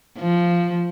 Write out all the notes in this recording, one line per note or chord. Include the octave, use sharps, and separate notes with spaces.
F3